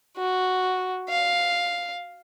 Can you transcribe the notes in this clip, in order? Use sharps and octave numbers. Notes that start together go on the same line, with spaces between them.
F#4
F5